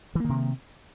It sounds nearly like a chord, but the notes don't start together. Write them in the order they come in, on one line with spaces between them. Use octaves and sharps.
E3 A#3 D#3 C3